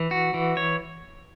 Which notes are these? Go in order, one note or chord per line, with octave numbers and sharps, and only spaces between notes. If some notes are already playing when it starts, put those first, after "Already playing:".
Already playing: E3
F#4
E3
C#5